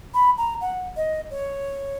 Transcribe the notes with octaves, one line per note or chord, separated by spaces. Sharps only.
B5
A#5
F#5
D#5
C#5